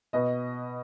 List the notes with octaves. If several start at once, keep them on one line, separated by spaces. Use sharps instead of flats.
B2 B4 D#5